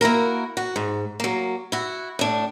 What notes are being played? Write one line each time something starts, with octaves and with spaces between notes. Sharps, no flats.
A#3 E4 F#4 A#4
F#4
G#2
F#3 A#3
E4 F#4
A2 D4